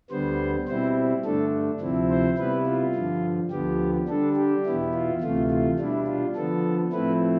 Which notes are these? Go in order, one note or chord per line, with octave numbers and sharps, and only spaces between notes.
D2 D3 G3 B3 C5
B2 G3 C4 E4 C5
G2 D3 A3 D4 A4
D2 C3 F3 C4 E4
C5
C3 G3 B3 E4 B4
F4
G2 D3 F3
D2 D3 F3 B3 G4
D3 G3 D4 A4
G4
E2 B2 B3 E4
F4
D2 C3 E3 A3 F4
F4
B2 G3 D4 E4
F4
D3 F3 B3 A4
A2 F3 A3 C4 E4 B4